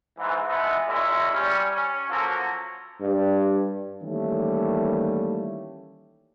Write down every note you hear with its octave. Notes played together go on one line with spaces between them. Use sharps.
G#2 E3
G#3 A3 B3 D#4 E4
A#2 G#3 A#3 C#4 E4
G3 C#4
C#4
F3 F#3 A#3 C#4 A4
G2
D#3 E3 G3 A3 A#3 C#4